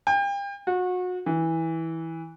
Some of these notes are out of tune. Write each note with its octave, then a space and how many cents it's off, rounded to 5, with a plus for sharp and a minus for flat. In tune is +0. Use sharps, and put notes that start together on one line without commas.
G5 +35
F#4 -30
E3 -15